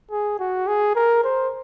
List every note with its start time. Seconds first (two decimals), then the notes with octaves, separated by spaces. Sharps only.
0.11 G#4
0.40 F#4
0.68 G#4
0.96 A#4
1.24 C5